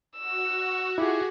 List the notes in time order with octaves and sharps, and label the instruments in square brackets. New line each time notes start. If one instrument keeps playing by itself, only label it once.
[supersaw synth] F#4 [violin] E6
[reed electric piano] E4 F4 [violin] G4 G#4